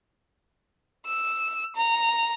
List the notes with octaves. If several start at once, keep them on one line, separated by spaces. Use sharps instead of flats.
E6
A#5